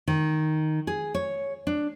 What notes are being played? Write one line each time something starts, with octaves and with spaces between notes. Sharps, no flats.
D#3
G#4
C#5
D4